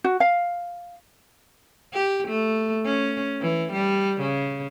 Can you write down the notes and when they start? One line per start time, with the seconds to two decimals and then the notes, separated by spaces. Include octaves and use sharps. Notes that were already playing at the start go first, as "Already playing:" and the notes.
0.04 F#4
0.20 F5
1.93 G4
2.28 A3
2.86 C#4
3.41 E3
3.72 G3
4.21 C#3